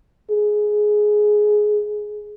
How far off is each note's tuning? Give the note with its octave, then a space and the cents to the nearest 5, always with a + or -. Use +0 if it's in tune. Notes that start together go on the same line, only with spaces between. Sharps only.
G#4 +10